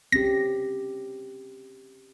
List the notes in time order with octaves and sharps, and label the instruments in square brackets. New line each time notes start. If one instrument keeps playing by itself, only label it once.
[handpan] C4 C#4 G4 [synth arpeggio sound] A#6